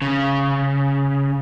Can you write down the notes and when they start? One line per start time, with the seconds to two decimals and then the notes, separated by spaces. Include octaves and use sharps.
0.02 C#3